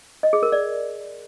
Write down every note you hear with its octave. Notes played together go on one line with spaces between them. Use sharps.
D#5
G#4
A#4
D5